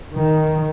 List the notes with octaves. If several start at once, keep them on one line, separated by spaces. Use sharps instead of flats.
D#3